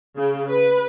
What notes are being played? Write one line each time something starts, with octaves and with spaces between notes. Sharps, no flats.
C#3
B4